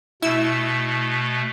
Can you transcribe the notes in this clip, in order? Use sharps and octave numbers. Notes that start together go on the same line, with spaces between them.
B2 A3 E4 E6